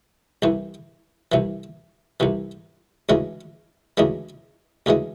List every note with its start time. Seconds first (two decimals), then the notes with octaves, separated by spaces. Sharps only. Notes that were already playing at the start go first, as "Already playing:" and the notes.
0.42 C2 C3 E3
1.32 C2 C3 E3
2.20 C2 C3 E3
3.09 D2 C#3 E3 G#3
3.97 D2 C#3 E3 G#3
4.86 D2 C#3 E3 G#3